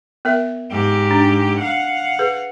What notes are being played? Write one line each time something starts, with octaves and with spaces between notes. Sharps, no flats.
B3 A#4 E5
G#2 G4
D4
F5 F#5
G#4 B4